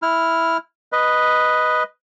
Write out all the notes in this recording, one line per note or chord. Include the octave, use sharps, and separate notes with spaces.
E4 F6
B4 D#5